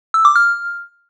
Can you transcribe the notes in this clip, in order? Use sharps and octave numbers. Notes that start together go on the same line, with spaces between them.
E6
D6
F6